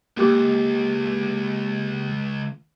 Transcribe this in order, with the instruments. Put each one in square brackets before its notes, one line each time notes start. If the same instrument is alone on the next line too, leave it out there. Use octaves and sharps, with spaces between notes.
[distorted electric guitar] C#2 [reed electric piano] A#3 G4 D6